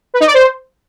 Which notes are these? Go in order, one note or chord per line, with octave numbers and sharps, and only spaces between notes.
B4
D#4
D5
C5